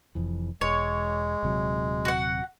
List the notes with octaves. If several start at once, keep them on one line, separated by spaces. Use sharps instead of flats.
F1 F2 E3
E1 G#3 C#5
D#1 C3 F#3
F#4 F#5